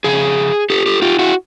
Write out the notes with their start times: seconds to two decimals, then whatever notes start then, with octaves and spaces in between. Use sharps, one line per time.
0.04 F2 C#3 G#4
0.70 G4 A4
0.86 G4 A4
1.02 F4 G4
1.19 E4 F#4